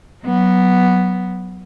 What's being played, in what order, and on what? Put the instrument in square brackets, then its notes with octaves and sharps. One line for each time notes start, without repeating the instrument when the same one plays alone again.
[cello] F#3 B3